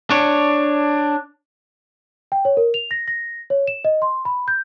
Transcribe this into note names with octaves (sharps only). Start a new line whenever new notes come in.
D4 C#5
G5
C#5
A#4
F7
A#6
A#6
C#5
E7
D#5
C6
B5
G6